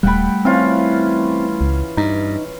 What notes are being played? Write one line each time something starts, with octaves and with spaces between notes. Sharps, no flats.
D#1 G3 A3 F#5 G5 B5
E3 C4 C#4 F4
C#2
G2 D#4